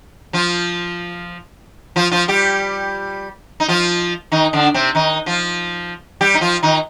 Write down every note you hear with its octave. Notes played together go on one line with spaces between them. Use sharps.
F3 F4
F3 F4
F3 F4
G3 G4
D#4
F3 F4
D#3 D#4
D3 D4
C3 C4
D#3 D#4
F3 F4
G3 G4
D#4
F3 F4
D#3 D#4